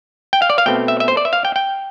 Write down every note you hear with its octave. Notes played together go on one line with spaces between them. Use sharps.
G5
F5
D5
F5
B2 A3 C4 G5
E5
E5
C5
D5
E5
F5
G5
G5